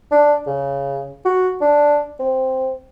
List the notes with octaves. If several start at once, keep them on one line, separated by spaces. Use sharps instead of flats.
D4
C#3
F#4
D4
C4